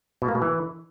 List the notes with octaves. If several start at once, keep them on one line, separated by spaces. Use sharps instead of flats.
B2
A#3
B2
E3